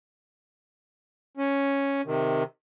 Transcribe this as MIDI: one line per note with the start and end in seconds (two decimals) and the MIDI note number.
1.37 2.01 61
2.06 2.43 48
2.06 2.43 51